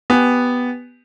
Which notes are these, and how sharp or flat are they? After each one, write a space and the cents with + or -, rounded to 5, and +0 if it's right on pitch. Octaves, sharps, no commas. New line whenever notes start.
B3 +0 G4 +0 G#5 +0